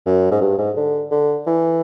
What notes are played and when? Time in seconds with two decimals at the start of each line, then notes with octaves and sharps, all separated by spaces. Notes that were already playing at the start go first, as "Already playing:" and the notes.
0.06 F#2
0.31 G#2
0.41 G2
0.59 G#2
0.77 D3
1.11 D3
1.47 E3